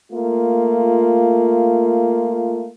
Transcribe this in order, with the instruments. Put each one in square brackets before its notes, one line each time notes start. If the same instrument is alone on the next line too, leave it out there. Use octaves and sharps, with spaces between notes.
[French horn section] A3 A#3 F4